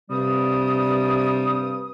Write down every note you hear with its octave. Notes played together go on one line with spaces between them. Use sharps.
G2 C3 G3 D#6